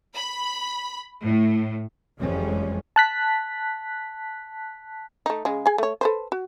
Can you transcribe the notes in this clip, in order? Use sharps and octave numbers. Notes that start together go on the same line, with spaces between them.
B5
A2
F#1 F2 E3 G3 G#3 C#4
A5 F#6 B6
A3 D#4
C#3 G#3
G#4 G#5
A3 C#5
A4 B4 C5
F#4